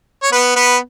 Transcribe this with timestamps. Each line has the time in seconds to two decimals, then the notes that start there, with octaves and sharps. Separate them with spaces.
0.23 C#5
0.32 B3 B4
0.56 B3 B4